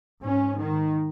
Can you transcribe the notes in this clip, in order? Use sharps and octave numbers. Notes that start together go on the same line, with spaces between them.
G#2 C#4
D#3